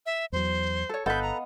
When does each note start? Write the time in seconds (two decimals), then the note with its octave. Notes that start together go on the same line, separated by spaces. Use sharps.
0.06 E5
0.32 E2 F#3 C5
0.89 A4 C#5
1.06 G1 B3 A4 B4 D#5 F5 G6
1.22 A#5